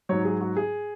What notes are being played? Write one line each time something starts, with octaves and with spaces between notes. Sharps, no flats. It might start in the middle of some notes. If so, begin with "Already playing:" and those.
G#2 F#3 C#5
G#4
F#4
G#4